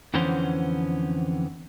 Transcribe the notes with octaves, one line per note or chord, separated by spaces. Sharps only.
F2 D3 E3 B3 C#4 C5